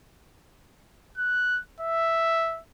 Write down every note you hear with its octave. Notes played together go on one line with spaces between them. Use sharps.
F#6
E5